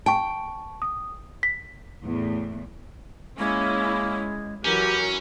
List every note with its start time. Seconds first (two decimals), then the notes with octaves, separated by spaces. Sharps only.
0.06 G5 A5 C#6
0.82 D#6
1.43 B6
2.02 E2 A2
3.39 G#3 A#3 C#4 E4
4.65 E3 F#3 C#4 G4 A#4